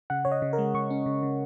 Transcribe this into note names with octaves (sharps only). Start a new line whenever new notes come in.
C#3 F#5
C#3 C#5
D#5
C#3
A#4
G#3
C#3 C#6
C#4
C#3
C#3